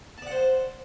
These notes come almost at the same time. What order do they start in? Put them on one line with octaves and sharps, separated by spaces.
A5 D5 F#5 C5